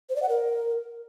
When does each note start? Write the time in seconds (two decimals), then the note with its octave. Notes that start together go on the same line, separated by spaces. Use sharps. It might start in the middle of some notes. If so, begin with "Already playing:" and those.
0.09 C5
0.16 D5
0.22 F#5
0.29 A#4